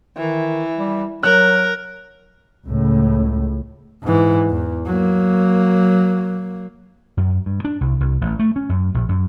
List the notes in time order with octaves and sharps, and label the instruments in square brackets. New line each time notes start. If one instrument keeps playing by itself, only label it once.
[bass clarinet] D#3 [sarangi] E3
[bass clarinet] G3
[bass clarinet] F#3 [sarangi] A#4 [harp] F#6
[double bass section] C#2 A2
[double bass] G#2 E3
E2
F#3 A#3
[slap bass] F#2
G2
D4
C2
C2
A1
A3
C#4
F#2
A#1
F#2